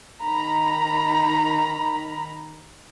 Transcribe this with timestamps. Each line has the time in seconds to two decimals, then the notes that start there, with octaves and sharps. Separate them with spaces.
0.24 D#3 A#5 B5